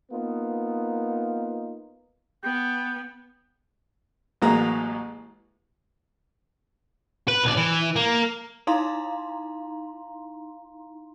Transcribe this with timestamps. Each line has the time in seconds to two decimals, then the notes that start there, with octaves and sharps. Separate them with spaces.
0.11 A#3 B3 D#4 F4
2.44 B3 G5
4.42 A1 F#3 G#3 A#3 B4 A#5
7.28 B4
7.43 B1 D5
7.57 E3
7.96 A#3
8.67 D#4 E4 F5 A#5 C6